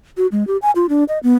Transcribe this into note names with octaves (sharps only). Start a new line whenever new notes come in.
F#4
G#3
G4
G#5
F4
D4
D#5
B3